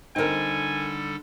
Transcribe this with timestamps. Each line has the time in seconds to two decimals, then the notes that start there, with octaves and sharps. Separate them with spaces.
0.16 D3 G3 C4 D#4 A4 A#4 G#5